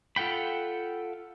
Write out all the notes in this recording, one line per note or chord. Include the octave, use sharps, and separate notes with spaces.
F4 A4 F#5 G5 B5